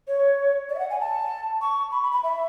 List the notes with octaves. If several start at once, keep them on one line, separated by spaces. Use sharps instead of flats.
C#5
D5
E5
F#5
G#5
A5
C#6
B5
B5
B5
E5